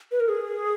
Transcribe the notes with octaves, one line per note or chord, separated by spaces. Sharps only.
B4
A#4
G#4